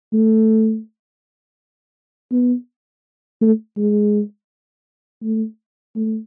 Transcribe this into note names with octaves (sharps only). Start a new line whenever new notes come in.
A3
B3
A3
G#3
A3
A3